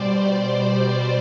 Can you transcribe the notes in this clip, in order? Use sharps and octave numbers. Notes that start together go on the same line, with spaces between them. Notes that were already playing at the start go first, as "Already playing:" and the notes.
Already playing: B2 G3 C5 D5
C5